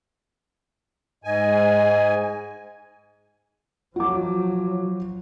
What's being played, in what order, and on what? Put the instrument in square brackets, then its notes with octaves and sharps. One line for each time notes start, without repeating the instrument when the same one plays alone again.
[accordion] G#2 G#5 [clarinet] D#5
[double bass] F3 F#3 [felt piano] F#4 D6